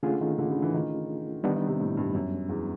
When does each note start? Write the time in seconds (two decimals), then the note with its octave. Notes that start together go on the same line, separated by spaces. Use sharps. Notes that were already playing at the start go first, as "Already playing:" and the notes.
0.03 D3 A3 C#4 F4 G#4
0.21 D#3
0.38 D3
0.51 C#3
0.62 E3
0.74 D#3
1.44 D#3 G3 B3 D4
1.56 D#3
1.67 C3
1.80 A2
1.97 G2
2.15 F#2
2.49 E2